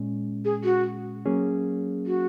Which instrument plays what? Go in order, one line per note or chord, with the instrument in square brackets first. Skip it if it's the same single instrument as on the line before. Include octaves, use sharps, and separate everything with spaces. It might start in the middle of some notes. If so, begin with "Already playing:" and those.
Already playing: [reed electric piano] A#2 G#3 C#4
[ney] G#4
F#4
[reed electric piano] F#3 A#3 C#4 G#4
[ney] F#4